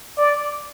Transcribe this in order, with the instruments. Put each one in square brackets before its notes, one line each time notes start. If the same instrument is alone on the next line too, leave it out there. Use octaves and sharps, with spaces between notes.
[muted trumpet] D5